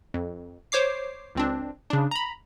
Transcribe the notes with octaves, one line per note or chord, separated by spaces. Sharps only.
F2
C5 C#5 D6 C7
C#2 C4 D4
C#3 D4
A#5 B5